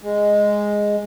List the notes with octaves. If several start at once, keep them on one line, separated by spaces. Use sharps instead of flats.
G#3